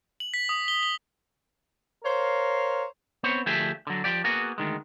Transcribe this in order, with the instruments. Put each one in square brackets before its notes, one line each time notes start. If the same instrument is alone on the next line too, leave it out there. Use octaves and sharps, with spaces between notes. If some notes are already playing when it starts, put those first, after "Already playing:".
[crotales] F#7
B6
D#6
G7
G7
[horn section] A#4 C5 C#5 F5
[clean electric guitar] B3 C4 C5 C#5
D2 F3 A3 G4 G#4 E5
D3 F#3
F3 G4 D5
A#3 B3 F#4 G#4
D2 D#3 G#3